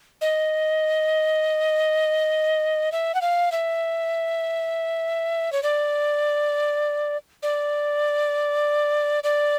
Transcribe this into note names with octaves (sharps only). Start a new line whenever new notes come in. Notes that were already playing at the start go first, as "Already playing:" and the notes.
D#5
E5
F#5
F5
E5
C#5
D5
D5
D5